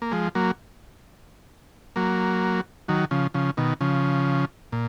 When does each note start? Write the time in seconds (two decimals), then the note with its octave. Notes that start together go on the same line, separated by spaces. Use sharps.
0.02 A#3
0.12 F3 G#3
0.35 F#3 A#3
1.96 F#3 A#3
2.88 D#3 F#3
3.11 C#3 F3
3.34 C#3 F3
3.57 B2 D#3
3.81 C#3 F3
4.72 A#2